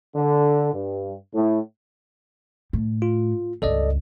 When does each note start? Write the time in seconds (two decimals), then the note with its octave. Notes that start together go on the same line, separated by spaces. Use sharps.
0.15 D3
0.72 G2
1.34 A2
2.73 A2
3.02 F4
3.62 C#2 G2 A4 D5 D#5